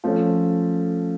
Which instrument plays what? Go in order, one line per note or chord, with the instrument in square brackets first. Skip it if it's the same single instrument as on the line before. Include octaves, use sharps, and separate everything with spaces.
[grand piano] F3 A3 C#4